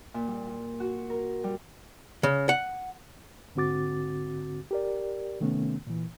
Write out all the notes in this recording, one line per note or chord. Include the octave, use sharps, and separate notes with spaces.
A#2
G3
F4
F#4
A#4
G3
C#3
F#5
G#2 D3 C4 F#4 D6 A6
G4 A#4 D5
C3 D#3 A3 B3 C#4
A#2 E3